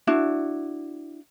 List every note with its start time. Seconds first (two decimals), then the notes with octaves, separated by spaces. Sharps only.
0.07 D4 E4 F#4